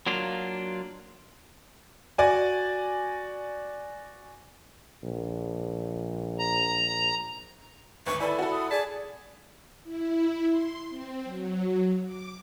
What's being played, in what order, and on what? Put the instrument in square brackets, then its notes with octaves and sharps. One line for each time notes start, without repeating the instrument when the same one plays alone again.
[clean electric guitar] F#3 A#3 D4 F4
[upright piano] F#4 D5 G#5
[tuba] A#1
[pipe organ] A#5
[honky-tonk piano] G#1 D2 [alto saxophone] B4 [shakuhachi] C#6
[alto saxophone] E4 [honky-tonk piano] A4 B4 G#5 [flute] D5 [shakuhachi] B5
[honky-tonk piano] F#4 A4
[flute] D#6
[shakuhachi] G#4 [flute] D5 [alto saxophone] A5 [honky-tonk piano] B6
[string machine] E4
C6
C4
F#3
D6